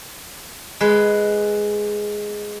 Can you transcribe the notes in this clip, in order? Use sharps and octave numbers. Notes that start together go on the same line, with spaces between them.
G#3 B4